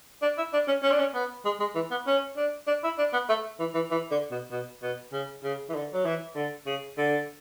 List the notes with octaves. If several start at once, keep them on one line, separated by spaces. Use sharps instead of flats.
D4
E4
D4
C#4
C#4
D4
C#4
B3
G#3
G#3
E3
B3
C#4
D4
D4
E4
D4
B3
A3
E3
E3
E3
D3
B2
B2
B2
C#3
C#3
E3
D3
F#3
E3
D3
C#3
D3